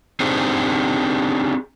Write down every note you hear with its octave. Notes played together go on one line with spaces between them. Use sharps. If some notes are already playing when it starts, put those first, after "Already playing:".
C4 D4 D#4 G4 G#4 C5